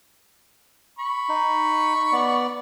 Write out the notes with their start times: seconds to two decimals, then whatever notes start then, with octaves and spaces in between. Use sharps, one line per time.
0.99 B5 C#6
1.29 D#4
2.12 B3 D5